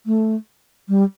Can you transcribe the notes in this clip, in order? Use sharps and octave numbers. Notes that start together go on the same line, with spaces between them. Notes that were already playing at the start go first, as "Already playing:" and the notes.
A3
G3